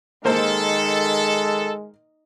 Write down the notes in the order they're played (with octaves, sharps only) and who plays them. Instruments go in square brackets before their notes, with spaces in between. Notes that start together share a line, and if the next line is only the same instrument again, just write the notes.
[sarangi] D#3 [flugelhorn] G#3 [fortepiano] A#3 C5 [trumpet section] A4